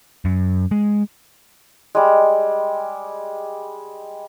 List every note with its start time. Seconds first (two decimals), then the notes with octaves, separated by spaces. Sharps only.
0.25 F#2
0.71 G#3
1.95 G3 G#3